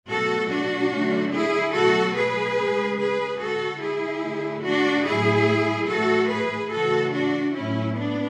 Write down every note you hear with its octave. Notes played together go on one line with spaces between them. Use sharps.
B2 F#3 A3 F#4 A4
D4 F#4
D3 F#3 A3
E4 G#4
B2 F#3 A3 F#4 A4
G#4 B4
C#3 G#3
G#4 B4
D3 G#3 F#4 A4
E4 G#4
D3 A3
D4 F#4
A2 F#3 A3 E4 G#4
A2 E3 A3 F#4 A4
G#4 B4
C#3 E3 A3 F#4 A4
D4 F#4
A2 F#3 A3 C#4 E4
B3 D4